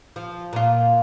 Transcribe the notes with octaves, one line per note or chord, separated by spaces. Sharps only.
F3
A#2 F4